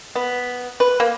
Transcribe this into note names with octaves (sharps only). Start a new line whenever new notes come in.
B3
B4
A#3